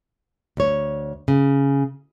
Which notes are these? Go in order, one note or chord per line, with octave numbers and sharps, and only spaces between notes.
D2 C#5
C#3